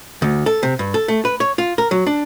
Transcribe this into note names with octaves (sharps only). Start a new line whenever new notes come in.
D2
A4
C3
G2
A4
A3
B4
C#5
F4
A#4
F#3
D4